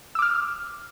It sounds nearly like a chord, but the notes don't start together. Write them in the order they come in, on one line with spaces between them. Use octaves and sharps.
E6 D6 F6